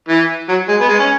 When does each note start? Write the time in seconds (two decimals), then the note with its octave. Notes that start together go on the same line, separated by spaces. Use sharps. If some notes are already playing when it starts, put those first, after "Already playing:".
0.08 E3
0.48 F#3
0.68 G#3
0.80 B3
0.89 G#3
0.99 C#4